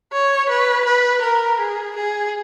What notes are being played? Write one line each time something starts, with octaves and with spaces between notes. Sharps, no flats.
C#5
B4
B4
A#4
G#4
G#4